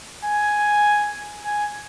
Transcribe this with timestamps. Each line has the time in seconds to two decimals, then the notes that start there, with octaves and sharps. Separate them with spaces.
0.25 G#5
1.45 G#5